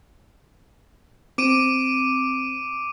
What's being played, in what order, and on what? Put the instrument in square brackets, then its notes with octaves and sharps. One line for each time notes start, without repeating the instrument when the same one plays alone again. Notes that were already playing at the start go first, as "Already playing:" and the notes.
[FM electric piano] C4 [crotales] D6 D7 D#7